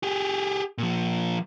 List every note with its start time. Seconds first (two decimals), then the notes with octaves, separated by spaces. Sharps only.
0.03 G4 G#4
0.78 A#2 F3